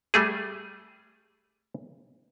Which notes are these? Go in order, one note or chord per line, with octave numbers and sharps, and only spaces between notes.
G3 A3 G#4